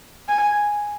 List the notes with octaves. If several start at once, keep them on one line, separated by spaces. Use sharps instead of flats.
G#5